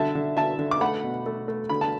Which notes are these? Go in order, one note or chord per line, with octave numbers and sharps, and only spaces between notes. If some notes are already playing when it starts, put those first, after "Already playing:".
Already playing: D3 E5 A5
D3
D3 E5 A5
D3
D6
A3 F#5 B5
B2
A3
A3
D3 B5
A5